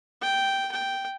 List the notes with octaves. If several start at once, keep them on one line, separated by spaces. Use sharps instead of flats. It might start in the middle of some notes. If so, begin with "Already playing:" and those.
G5
G5